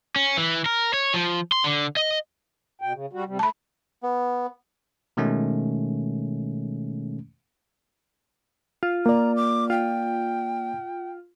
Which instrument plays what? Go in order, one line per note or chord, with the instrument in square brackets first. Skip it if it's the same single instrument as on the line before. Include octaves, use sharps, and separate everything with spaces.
[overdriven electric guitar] C#4
E3
A#4
C#5
F3
C6
D3
D#5
[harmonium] B2 G5
C#3
G3 F#4
C3 G3
[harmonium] A3 [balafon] A5 B5
[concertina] B3
[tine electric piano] B2 D#3 G#3 A3 C#4
[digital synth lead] F4
[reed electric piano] A#3 D5 [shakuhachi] A#5
[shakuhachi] D6
[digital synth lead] F4 [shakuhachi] G5